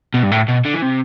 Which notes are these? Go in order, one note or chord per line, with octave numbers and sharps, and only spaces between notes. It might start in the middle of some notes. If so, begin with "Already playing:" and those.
B2
G2
A2
B2
D3
E3
C3